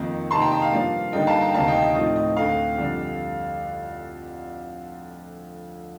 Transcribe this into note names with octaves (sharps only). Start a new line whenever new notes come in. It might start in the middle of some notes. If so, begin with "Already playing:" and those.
Already playing: F2 D#3 A#3 D#4
C3 D#3 A#3 D#4 A5 C6
G5 A#5
D#5 G5
F5
G2 F3 A#3 D4
G2 D3 G3 A#3 D#4 D#5 G5
F5 A5
G5 A#5
D2 C3 D#3 A#3 D4 F5 A5
D#5 G5
D#5
A2 F3 C4 D#4 D#5
D#5
D2 D3 A3 C4 F5
F2 D3 G3 D4